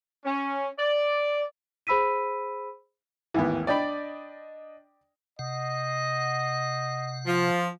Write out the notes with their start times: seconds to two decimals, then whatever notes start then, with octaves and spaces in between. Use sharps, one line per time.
0.25 C#4
0.78 D5
1.87 G#4 C5 B5 E6 B6 D#7
3.34 A1 D#2 G#2 E3 B3
3.67 D4 D5 D#5 G5 B5
5.39 C3 D#5 F#5
7.27 F3